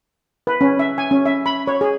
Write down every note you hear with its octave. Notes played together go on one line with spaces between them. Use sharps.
B4
C#4
E5
G#5
C#4
E5
B5
C#5
G#4